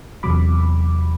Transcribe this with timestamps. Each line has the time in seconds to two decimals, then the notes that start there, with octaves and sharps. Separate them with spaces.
0.23 E2 C3 F#3 B5 D6